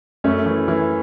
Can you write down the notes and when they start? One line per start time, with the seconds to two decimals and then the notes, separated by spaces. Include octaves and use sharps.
0.24 F#2 A3 C#4
0.46 E3
0.68 E3